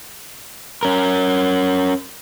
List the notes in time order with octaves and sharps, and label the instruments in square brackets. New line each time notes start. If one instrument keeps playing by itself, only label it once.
[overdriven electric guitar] C#4 A#4